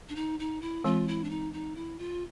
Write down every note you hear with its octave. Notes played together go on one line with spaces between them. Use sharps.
D4
D#4
D#4
E4
E3 G#3 C4 F4
E4
D4
D#4
D#4
E4
F4